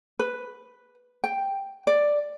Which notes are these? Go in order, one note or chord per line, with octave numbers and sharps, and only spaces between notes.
B4
G5
D5